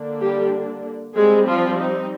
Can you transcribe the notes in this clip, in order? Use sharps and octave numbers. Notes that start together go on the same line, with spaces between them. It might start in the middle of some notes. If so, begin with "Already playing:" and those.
Already playing: D3 A#3 D4
G3 G4
G3 G#3 C4 G#4
F3 F4
D#4